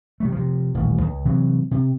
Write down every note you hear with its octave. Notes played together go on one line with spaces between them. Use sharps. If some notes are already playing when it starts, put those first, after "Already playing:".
C3 G3 A3
C3 F3
D#1 A1
C#2
C3 E3 F#3
C3